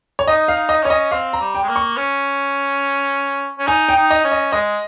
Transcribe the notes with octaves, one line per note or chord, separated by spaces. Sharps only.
C#5
D#4 D#5
F5
D#4
D#4 D#5
C#4 C#5
D#5
C4 F5
A#5
G3
G5
G#3
A#3
C#6
C#4
C#4
D#4 G#5
G5
D#4
D#5
C#4
D#5
G#3 D#5